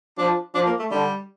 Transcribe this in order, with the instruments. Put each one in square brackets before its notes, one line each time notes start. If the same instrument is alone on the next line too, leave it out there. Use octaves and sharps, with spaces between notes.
[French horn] F3 [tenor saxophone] D4
[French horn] F3 [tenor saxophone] D4
[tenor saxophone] A#3
A3
[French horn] D3 [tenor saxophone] G3